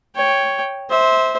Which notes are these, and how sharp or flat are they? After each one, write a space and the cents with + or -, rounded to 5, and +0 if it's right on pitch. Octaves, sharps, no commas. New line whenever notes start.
C#5 +0 G5 +0
C5 +0 E5 -25